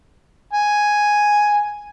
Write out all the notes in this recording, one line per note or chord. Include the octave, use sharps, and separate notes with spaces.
G#5